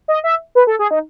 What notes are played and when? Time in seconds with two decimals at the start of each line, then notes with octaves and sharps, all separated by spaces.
0.08 D#5
0.24 E5
0.55 B4
0.67 A4
0.79 G#4
0.91 D#4